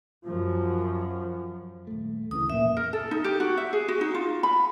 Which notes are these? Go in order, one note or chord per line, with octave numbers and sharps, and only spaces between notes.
F#2 F3
D#1 A3
C#2 C#3 E3 D#6
F2 A#2 A#3 E5
A#4
A4
D#4
G4
F#4
E5
G#4
F#4
D#4
F4
B5